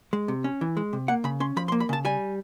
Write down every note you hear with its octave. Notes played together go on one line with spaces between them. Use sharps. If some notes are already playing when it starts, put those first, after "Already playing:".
G#3
C3
C#4
E3
G#3
C3
A#3 F#5
C#3 B5
C#4 C6
F3 B5
C6
A#3
B5
C#3 A5
G3 G#5